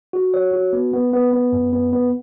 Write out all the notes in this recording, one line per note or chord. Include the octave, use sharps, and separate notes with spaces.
F#4
C#5
F#4
B3
B3
B3
B3
F#2
B3
B3